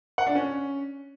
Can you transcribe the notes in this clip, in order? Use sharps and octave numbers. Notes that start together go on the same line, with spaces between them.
F#5
D4
C#4